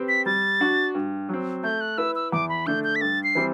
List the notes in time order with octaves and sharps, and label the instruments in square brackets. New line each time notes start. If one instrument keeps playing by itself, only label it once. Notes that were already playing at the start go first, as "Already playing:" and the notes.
Already playing: [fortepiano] C4 G4 B4
[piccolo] B6
[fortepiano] G3 [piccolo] A6
[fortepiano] D4 F#4
G2
F#3 C4
[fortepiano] A3 [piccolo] G6
[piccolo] F#6
[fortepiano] E4 B4 E5 [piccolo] E6
[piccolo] E6
[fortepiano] E2 [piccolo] D6
[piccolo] B5
[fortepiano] D3 A3 D4 [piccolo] G6
[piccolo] G6
B6
[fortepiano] G2 [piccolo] A6
[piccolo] C7
[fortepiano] E3 G3 C4